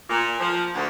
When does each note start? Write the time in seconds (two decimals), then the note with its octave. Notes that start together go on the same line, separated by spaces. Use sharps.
0.09 A#2
0.40 F3
0.75 D2